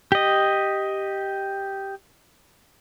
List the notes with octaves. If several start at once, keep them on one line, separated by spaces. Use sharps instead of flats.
G4 D#5